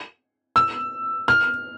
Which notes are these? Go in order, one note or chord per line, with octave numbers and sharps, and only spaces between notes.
E6
F6